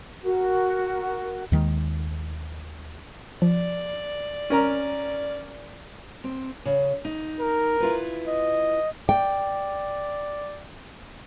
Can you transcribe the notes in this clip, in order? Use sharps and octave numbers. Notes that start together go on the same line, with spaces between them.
F#4 A#4
D#2 D#3 G#3
F3 D5
C#4 A#4 A#5
C4
C#3
D#4
A#4
E4 F4 B4
D#5
D5 G5